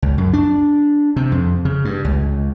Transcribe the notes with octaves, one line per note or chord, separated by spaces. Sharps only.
C#2
F#2
D4
C3
F2
C#3
G2
C#2